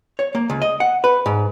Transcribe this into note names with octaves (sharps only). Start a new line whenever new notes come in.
C#5
A#3
C#2
D#5
F#5
B4
G#2